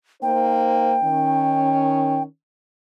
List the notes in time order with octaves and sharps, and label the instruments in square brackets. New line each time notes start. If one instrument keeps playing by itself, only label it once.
[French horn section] A#3 D#4 C5 [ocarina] G5
[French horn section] D#3 C#4